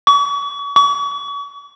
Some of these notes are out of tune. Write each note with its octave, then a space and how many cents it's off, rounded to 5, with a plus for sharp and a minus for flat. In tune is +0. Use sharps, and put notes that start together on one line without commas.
C#6 +40
C#6 +40